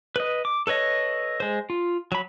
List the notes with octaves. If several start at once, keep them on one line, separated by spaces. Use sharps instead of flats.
B4 D#5
D6
A4 B4 C#5 D#5
G#3 C5
F4
F#3 B5